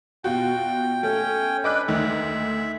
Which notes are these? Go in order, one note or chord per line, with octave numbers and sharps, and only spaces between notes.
B2 F4 F#4 G5
A3 C#4 G5
D4 B4 D#5 D6 F#6
D2 D#3 E5